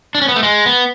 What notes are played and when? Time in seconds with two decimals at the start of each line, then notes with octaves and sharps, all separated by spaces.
0.15 D4
0.22 C#4
0.28 B3
0.36 A3
0.43 G#3
0.66 B3